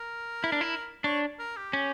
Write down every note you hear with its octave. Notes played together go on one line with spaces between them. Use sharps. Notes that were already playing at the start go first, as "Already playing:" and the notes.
Already playing: A#4
E4
D4
E4
D4 C#5
A#4
G4
C#4